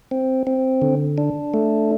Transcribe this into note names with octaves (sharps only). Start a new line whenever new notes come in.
C4
C4
D3
D4
A3